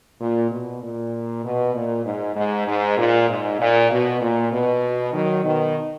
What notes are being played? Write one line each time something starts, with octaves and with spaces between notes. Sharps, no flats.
A#2
B2
A#2
B2
A#2
G#2
G#2
G#2
A#2
G#2
A#2
B2
A#2
B2
D#3 F#3
B2 D#3